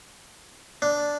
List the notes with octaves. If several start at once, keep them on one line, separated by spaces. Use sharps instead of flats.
D4